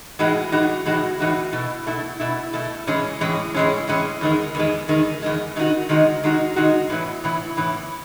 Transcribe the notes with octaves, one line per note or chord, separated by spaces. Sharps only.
A2 E3 G#3 D#4 F#4
A2 E3 G#3 D#4 F#4
A2 E3 G#3 D#4 F#4
A2 E3 G#3 D#4 F#4
B2 A3 E4
B2 A3 E4
B2 A3 E4
B2 A3 E4
A2 E3 G#3 C#4
A2 E3 G#3 C#4
A2 E3 G#3 C#4
A2 E3 G#3 C#4
E2 D#3 G#3
E2 D#3 G#3
E2 D#3 G#3
E2 D#3 G#3
D#3 G#3 D#4 F#4
D#3 G#3 D#4 F#4
D#3 G#3 D#4 F#4
D#3 G#3 D#4 F#4
A2 E3 B3 E4
A2 E3 B3 E4
A2 E3 B3 E4